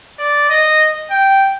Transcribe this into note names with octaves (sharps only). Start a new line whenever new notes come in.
D5
D#5
G5